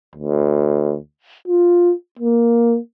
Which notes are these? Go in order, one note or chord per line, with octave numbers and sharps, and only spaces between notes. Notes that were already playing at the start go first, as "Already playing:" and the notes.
D2
F4
A#3